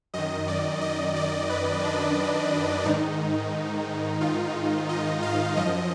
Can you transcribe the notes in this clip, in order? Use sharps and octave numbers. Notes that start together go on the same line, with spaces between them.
F#2 D#3 D#5
D5
D#5
D5
B4
D4
G#2 D#3 D#4
F4
D#5
F5
F#2 F3 D#5